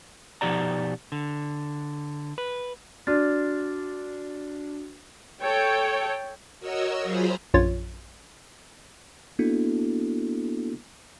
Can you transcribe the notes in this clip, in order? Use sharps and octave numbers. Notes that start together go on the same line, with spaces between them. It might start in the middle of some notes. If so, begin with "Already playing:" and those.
B2 F3 D#4 G4 D5 A#5
D3
B4
D4 F#4 F6 A6
A4 C#5 G5
F#4 A#4 C#5 D#5 E6
F#3 F4 G#4 C5 A#5 B5
A#1 F#2 F4 C#5 A6
A#3 B3 D4 E4 F#4 A4